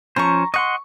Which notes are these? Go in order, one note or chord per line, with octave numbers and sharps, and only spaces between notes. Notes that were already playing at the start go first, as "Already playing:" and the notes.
F3 C#4 C5 A#5 C#6
D#5 F#5 C6 C#6